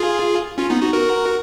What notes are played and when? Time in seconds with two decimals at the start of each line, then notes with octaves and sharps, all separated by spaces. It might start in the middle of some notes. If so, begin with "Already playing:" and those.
Already playing: F4 G#4
0.58 C#4 F4
0.70 B3 D#4
0.82 D#4 F#4
0.93 F#4 A#4